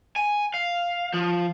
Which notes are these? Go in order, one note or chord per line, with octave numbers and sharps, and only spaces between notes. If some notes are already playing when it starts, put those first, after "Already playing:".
G#5
F5
F3